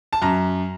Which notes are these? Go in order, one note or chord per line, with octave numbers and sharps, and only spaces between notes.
A5
F#2 A#5